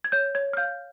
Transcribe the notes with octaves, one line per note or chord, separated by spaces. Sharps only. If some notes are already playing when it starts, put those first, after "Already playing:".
G#6
C#5 G6
C#5 G#6
F6
F5 G6